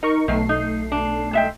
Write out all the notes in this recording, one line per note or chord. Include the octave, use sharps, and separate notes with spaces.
D#4 A#4 C#6
B1 D#3 A3 C7
D#4
D4
G#3 E5 G5